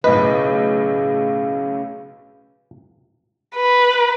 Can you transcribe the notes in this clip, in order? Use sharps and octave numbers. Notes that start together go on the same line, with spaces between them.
B1 A2 C#3 B4 D#5
B4